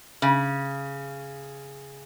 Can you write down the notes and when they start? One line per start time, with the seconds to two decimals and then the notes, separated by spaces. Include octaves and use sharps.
0.22 C#3